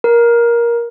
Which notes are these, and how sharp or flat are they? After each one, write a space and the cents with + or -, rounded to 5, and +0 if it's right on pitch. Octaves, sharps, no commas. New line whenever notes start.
A#4 +15